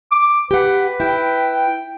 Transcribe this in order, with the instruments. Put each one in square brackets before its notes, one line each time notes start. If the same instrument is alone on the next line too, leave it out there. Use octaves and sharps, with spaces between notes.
[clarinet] D6
[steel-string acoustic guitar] G4 F#5 [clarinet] B4
[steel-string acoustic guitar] E4 [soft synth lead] G5